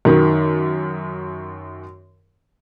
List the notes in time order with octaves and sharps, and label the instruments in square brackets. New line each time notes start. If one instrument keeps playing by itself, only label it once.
[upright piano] F#2 D#3